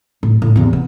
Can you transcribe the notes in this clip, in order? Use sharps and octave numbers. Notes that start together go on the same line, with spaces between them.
A2
A2
E2 C3
B3